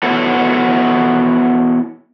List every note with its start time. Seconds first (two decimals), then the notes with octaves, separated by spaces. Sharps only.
0.03 B3 E4 F#4 A4 C#5